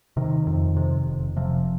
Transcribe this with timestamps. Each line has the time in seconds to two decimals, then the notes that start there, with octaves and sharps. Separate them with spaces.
0.17 C3 D#3
0.47 F2
0.77 C3
1.07 F1
1.36 C3 F3